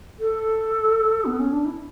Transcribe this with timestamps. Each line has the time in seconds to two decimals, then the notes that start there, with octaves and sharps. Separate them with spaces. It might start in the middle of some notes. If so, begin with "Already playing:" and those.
0.19 A4
1.25 B3
1.39 C#4
1.51 D4
1.65 E4